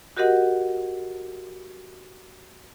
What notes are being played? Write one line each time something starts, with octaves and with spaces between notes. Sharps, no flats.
F#4 G4 A#4 D#5 F#5